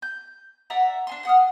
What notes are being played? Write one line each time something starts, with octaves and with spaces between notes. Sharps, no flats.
G6
D5 E5 F#5 A#5
D4 G#5 C6
F#5 D#6 F6